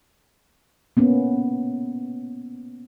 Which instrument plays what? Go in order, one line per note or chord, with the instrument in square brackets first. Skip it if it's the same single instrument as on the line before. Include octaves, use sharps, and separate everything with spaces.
[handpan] A#3 B3 C#4